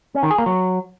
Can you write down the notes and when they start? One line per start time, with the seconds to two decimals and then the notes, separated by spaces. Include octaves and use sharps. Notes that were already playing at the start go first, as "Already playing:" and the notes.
0.15 C#4
0.23 D#3
0.31 G#4
0.38 A#3
0.46 F#3